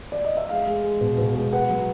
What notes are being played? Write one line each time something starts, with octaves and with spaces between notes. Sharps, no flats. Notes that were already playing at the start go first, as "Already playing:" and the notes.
D5
D#5
E5
G#3 F5
G#3
G#3
B2
B2
G#3
B3 F#5
F#3